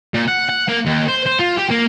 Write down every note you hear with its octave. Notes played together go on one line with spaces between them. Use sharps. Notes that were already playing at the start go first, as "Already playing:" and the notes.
A#2
F#5
F#5
A#3
D#2
C5
C5
F4
G4
A#3